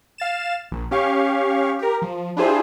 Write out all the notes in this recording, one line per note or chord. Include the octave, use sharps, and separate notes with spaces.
F5 A6 E7
A#1
C#4 G4 F5 C#6
G4 A#4
F3
D4 E4 F4 G4 G#4 C5